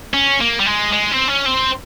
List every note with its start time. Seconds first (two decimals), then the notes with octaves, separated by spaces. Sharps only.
0.14 C#4
0.41 A#3
0.60 G3
0.66 G#3
0.93 G#3
1.11 C4
1.28 C#4
1.46 C4